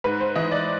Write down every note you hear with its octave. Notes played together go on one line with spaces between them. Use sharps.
G#2 B4
C5
E3 D#5
D5